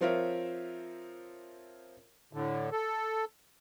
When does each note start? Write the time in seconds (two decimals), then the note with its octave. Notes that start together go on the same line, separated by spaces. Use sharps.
0.01 F3 C4 F4 A#4 C#5 E5
2.33 A2 D3
2.72 A4